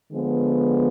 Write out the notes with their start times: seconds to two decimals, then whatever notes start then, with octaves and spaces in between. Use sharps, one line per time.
0.13 D3 F3 G#3 B3